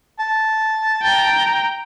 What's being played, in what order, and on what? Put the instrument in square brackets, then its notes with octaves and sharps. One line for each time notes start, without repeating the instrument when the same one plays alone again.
[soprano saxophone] A5
[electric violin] G5 A#5